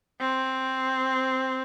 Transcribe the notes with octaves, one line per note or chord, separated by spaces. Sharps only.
C4